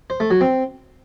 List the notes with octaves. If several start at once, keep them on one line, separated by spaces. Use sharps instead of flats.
C5
A3
F#3
C4